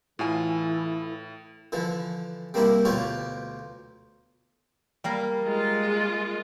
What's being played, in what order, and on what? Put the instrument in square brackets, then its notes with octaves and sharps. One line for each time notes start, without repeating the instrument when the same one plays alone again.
[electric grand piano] A2 [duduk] E3 [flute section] E4 A4 [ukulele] F4 G#5
[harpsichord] D3 E3 F3
G3 A#3 C4 D4 E4 G4
D2 B2 F4 G4 C#5 D5
[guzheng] G3 A#3 A#4
[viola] G#3 F4